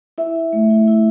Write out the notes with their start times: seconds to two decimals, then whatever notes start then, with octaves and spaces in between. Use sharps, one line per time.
0.18 E4 E5
0.35 E4
0.53 A3
0.70 E4
0.88 E4